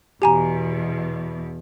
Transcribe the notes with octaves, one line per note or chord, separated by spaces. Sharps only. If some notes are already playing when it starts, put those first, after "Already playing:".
E2 B2 G4 G#5 A#5